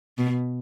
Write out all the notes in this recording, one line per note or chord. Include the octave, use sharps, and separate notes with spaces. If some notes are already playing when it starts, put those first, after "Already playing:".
B2